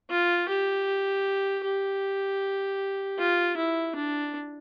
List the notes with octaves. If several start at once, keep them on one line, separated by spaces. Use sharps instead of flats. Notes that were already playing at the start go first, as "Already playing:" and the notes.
F4
G4
G4
F4
E4
D4